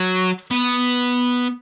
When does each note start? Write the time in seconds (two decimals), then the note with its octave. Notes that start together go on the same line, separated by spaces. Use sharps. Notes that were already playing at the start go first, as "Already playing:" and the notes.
Already playing: F#3
0.51 B3